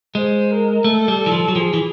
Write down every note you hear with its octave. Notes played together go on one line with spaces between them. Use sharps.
G#3 C5
A#4
A3 A4
G3
E3
F3
F#3
F3 G#4
E3